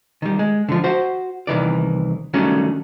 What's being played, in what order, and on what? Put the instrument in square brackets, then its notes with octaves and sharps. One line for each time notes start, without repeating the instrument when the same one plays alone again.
[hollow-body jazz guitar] D#3 G3
G#3
D3 F3
F#4 C5
C2 D#3 E3 D5
D#3 F#3 G3 A3 C#4 D4